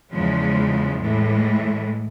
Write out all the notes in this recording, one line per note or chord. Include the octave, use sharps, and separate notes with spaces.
E2 C#3 F3 G#3
A2 E3 G#3